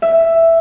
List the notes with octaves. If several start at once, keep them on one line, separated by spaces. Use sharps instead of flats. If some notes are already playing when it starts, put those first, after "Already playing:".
E5